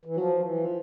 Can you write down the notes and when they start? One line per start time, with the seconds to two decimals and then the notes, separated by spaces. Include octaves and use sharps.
0.05 E3
0.16 F3 F#3
0.40 E3
0.64 F3